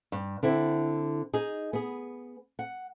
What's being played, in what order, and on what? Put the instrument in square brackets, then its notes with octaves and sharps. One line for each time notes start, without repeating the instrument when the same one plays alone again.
[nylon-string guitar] G2
D3 C4 E4
D#4 G#4
B3 G#4
F#5